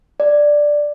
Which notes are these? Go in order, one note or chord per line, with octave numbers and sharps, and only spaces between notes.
D5